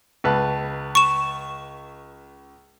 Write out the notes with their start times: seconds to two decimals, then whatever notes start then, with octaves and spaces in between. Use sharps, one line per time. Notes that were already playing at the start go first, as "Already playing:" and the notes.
0.24 C#2 B4 A5
0.95 C#6 E7